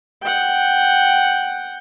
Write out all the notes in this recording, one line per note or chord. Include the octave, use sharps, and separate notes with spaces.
F#5 G5